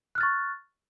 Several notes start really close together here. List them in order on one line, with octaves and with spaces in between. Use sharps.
F#6 F6 A6 C#6